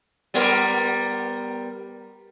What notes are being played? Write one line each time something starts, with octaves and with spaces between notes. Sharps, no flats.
G3 B3 A#4